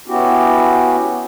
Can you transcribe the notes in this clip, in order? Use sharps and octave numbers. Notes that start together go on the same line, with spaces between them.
B3 C#4 E4 F#4 G4